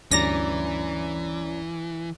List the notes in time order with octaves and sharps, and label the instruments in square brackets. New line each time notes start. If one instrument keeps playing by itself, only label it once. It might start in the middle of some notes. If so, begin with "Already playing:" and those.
[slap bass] D2 G2 [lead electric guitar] E3 [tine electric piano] C#4 D5 A#5 [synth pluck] A#6